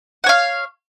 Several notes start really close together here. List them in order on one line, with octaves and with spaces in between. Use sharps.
F#5 C#5 F5